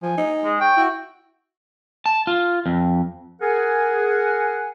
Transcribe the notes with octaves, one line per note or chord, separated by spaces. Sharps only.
F3 G#5
D#4
G#3
C#5 G5
E4 F#4
A5
F4
F2
G#4 A#4 F#5 G#5